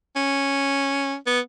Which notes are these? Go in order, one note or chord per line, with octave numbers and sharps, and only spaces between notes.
C#4
B3